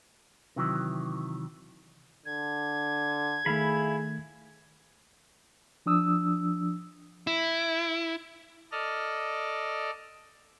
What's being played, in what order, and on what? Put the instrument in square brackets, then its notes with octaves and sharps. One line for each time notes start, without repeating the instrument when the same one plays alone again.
[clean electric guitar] C3 D#3 E3 F#3
[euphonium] D3 [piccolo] G#6
[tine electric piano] D#3 A3 [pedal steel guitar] E4 F5 B5 [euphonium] G#4
[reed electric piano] F3 D4 D#6 E6
[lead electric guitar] E4
[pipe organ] A4 D5 D#5 F6